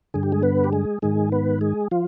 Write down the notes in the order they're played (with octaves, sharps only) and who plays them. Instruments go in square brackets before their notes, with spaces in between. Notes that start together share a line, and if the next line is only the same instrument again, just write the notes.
[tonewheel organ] G2 D3 G#4
G4
G#3 G#4
B3 B4
G4
G#3 G#4
G#2 D#3 G#3 G#4
B3 B4
G#3 G#4
F3 F4